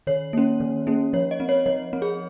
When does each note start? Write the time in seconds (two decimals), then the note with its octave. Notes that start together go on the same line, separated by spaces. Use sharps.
0.07 D#3 C#5
0.33 A#3 C#4
0.60 D#3
0.87 A#3 C#4
1.13 F3 C#5
1.31 D#5
1.40 C4
1.49 C#5
1.66 F3 C#5
1.93 C4
2.02 G#4